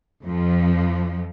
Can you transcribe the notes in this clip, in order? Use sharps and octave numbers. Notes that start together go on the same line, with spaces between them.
F2 F3